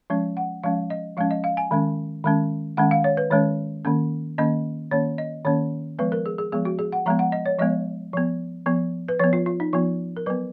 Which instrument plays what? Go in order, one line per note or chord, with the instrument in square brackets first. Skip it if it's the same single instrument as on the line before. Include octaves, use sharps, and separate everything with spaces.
[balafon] F3 G#3 C#4
F#5
F3 G#3 C#4 F5
D#5
F3 G#3 C#4 F5
D#5
F5
G#5
D#3 G#3 C#4
D#3 G#3 C#4
D#3 G#3 C#4 F#5
F5
C#5
B4
D#3 G#3 C#4 C#5
D#3 A#3 C#4
D#3 A#3 C#4 D#5
D#3 A#3 C#4 C#5
D#5
D#3 A#3 C#4 C#5
F3 G#3 B3 B4
A#4
G#4
G#4
F3 G#3 B3 G#4
F#4
G#4
F#5
F3 G#3 B3 A#5
F#5
D#5
C#5
F3 G#3 B3 D#5
F3 B3
F3 B3
B4
F3 B3 C#5
F4
F4
D#4
F3 B3 F4
A#4
F#3 B3 B4